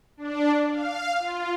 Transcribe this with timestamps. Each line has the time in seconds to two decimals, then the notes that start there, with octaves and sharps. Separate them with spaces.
0.17 D4
0.71 F5
1.19 F4